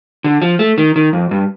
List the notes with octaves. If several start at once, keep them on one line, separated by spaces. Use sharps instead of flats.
D3
F3
A3
D#3
D#3
F2
G2